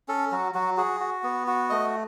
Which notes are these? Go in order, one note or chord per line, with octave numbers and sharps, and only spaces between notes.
C#4 A4
F#3 F#4
F#3 F#4
F#4 G#4
F#4
B3
F#4
A3 D#5